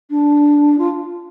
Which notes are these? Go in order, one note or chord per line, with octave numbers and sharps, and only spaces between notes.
D4
F4